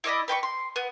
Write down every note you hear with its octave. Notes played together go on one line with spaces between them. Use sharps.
E4 D5 D#5 B5
B4 G5 B5 C#6
C6
B3